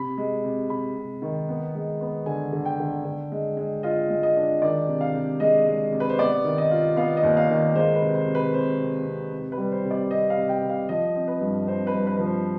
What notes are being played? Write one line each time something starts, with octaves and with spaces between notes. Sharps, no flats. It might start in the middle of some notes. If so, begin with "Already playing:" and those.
Already playing: C3 B5
G#3
C3
C3 B5
C3
D#3
B3
G#3
B3
D3 G#5
D3
G5
D3
D3
G#3
G#3
F4 D#5
G#3
D#5
D4
D#3 D5
C3
F5
C3
G#3 D#5
G#3
C3
B4
C5
B3 D5
D#3
D#5
F4
B3 F5
D#5
D#2
F5
D#3
G#3 C5
B4
C3
C5
C3
B4
C3 C5
C3
C3
C3
B4
G3
C5
C3
D5
C4 D#5
F5
C3
G5
C3
F5
F3 D#5
C4
B4
G2
C4 C5
B4
G2
B4
F3 B4
C5